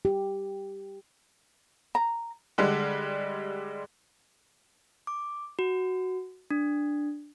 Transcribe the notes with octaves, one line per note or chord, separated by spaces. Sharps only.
G4
A#5
D3 G3 G#3
D6
F#4
D4